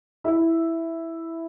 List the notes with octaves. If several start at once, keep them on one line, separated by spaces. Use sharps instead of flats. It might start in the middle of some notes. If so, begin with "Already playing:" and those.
E4 E5